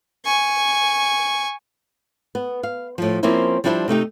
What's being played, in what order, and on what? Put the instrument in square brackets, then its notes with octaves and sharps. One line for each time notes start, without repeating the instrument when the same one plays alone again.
[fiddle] G#5 C#6
[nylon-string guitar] B3
F5
A2 F3
F3 A#3 C4 C#4 E4 C5
F3 G3 D4 E4 B4 C5
C3 A3 D#4 G4